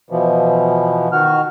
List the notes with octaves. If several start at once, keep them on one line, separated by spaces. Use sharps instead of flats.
B2 E3 F3
D#3 F#4 F6